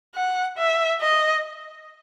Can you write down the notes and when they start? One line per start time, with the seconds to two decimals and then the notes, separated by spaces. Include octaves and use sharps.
0.16 F#5
0.58 E5
1.01 D#5